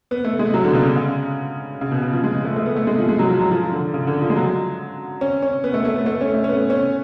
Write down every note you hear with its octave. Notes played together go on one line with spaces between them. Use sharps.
B3
A3
G#3
F#3
D3
B2
C#3
C#3
C#3
C#3
B2
C#3
F3
G#3
A3
A3
B3
A3
G#3
F3
G#3
F#3
F3
F#3
F3
F3
D3
C#3
D3
F3
G#3
F#3
C#4
C#4
B3
A3
A3
B3
A3
C#4
A3
C#4
B3
C#4